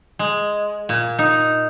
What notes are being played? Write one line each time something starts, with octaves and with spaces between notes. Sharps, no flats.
G#3
A#2
D#4